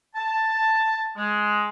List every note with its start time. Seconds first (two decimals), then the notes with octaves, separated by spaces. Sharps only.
0.16 A5
1.16 G#3